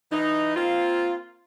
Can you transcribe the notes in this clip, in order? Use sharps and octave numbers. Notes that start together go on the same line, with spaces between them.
E3 D#4
A#3 C4 F4